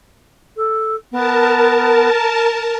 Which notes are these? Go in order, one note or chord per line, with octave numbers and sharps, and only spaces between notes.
A4
B3 A#4 A5
A#5